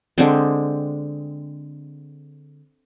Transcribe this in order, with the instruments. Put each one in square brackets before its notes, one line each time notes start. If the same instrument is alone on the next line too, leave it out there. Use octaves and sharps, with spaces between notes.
[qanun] D3 G#3 C4